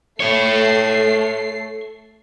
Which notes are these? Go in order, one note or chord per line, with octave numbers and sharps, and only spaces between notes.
A3 A4 C#5 C7